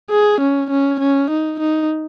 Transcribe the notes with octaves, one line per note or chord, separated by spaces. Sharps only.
G#4
C#4
C#4
C#4
D#4
D#4